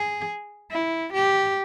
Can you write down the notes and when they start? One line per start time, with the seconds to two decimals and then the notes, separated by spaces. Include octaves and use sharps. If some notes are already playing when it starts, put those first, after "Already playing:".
Already playing: G#4
0.71 E4
1.13 G4